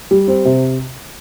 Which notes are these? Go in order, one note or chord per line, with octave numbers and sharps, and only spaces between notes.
G3
C4
C3